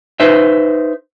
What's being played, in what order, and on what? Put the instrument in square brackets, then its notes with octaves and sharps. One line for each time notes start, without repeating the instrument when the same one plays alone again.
[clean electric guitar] D#4 B4 C5 E5